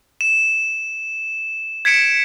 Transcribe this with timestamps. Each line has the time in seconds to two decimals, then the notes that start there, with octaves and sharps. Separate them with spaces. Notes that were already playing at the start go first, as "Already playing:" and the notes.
0.21 E7
1.85 G#6 B6 C#7 D7 E7